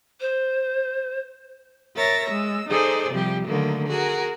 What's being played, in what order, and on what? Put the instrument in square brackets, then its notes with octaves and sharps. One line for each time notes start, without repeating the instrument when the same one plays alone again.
[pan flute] C5
[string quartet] A#4 C#5 E5 A6 A#6
G#3 E6
D#4 G#4 A4 C5 D5
C3 F3 G3 G4
D3 D#3 F#3 A3 A#3
F#4 G#4 A#4